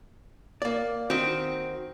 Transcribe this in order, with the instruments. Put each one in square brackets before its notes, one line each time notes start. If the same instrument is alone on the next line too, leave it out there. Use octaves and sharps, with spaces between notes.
[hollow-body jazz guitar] A#3 D5
[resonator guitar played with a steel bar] D#3 C4 [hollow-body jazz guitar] F#4